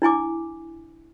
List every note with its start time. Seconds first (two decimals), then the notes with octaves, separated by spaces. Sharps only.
0.02 D4 E4 G#5 D6